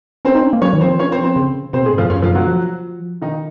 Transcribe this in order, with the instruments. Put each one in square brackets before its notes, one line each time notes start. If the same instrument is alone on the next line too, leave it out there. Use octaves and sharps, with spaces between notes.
[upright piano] C4 C5 [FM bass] C#4
[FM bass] D#4
C#4
A#3
[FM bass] F#3 [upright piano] C#4 C#5
[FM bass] D#3
[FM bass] F3 [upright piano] C4 C5
[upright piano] C#4 C#5
C4 C5
C4 C5
[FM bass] C#3
[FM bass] C3 [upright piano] C4 C5
[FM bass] A#2
[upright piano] G#3 G#4
[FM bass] G#2
[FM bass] F#2 [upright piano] F3 F4
[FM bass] F#2 [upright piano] C#3 C#4
[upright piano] F3 F4
F#3 F#4
[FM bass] F3
[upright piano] D#3 D#4